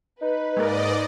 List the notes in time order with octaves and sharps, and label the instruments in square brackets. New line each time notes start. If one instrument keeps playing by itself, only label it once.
[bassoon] D#4 [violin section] B4
[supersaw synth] G#2 D5 D#5 [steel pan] G#3 A#3 A#4